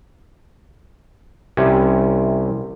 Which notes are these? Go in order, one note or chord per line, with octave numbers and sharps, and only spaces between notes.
C2 C3 C#4